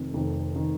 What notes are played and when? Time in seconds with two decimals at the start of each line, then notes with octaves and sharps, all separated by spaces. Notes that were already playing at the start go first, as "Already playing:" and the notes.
Already playing: F1 F2 D#3
0.13 F1 F2 D#3
0.56 D#3